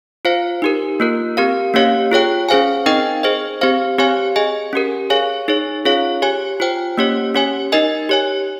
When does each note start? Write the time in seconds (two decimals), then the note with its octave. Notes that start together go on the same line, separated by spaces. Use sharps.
0.25 F4 C5 F5
0.62 D#4 G4 A#4
1.00 A#3 F4 A#4
1.37 C4 G4 A#4 F5
1.74 A#3 C#4 G4 C#5 F5
2.11 F4 G#4 C#5 G5
2.49 C#4 G#4 C5 F5 G#5
2.86 C4 D#4 A#4 D#5 G5
3.23 G#4 C5 D#5
3.61 C4 G4 C5 F5
3.98 C4 G4 C#5 F5 G#5
4.36 G#4 D#5 G#5
4.73 C#4 G4 A#4
5.10 G#4 C#5 F5 G#5
5.48 D#4 G#4 C#5
5.85 C#4 F4 G#4 C#5 F5
6.22 G4 C#5 G#5
6.60 F4 C5 G5
6.98 A#3 C#4 G4 C#5
7.34 C#4 G4 C#5 G#5
7.72 D#4 A#4 D#5 G#5
8.09 G4 C#5 G#5